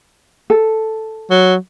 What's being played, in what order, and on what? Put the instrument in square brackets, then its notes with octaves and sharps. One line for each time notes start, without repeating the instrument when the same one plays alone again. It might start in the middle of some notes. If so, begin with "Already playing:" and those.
[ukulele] A4
[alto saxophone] F#3